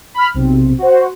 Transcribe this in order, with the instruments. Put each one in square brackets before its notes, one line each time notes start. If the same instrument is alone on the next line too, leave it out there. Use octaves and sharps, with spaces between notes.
[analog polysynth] B5 F6
B1 C3 C4
F#4 C5